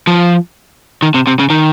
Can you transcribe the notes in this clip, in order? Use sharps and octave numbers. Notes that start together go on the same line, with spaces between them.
F3
D#3
C3
C3
C#3
D#3